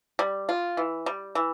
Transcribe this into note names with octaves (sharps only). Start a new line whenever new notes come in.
G3
F4
E3
G3
E3